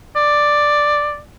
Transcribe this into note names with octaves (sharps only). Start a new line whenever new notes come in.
D5